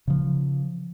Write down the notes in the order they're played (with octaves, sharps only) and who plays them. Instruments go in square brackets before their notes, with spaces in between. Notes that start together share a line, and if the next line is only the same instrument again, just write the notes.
[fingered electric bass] C#3 F3